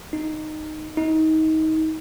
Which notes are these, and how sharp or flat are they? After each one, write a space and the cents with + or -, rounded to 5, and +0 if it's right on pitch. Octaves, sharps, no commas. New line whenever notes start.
D#4 -10
D#4 +25